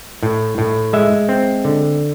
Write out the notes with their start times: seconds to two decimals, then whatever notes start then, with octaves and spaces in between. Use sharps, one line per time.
0.23 A2
0.58 A2
0.93 G#3 E5
1.29 C4
1.65 D3